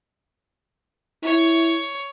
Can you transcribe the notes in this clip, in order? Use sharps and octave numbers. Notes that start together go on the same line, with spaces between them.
E4 C#5